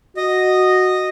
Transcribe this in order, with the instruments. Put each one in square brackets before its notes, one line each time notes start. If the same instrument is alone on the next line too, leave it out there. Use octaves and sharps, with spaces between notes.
[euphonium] F#4 [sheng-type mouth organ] D#5